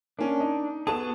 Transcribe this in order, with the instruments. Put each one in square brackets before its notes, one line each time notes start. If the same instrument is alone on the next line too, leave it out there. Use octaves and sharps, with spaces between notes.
[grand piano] A#3 C#4 [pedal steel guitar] D4
[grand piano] D#4
[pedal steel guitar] B3 F#4 G#4 [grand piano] A4 A5